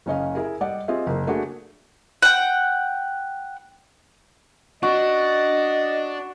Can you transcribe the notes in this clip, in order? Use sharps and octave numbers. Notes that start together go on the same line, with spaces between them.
F#1 C#4 D#5 F5
E4 G#4 A#4
G3 D5 D#5 F#5
C4 F4 G4 G#4 D#5 E5
F#1 A#3
A3 A#3 D4 F#4 G#4
F#5 G5
D4 F#4 D#5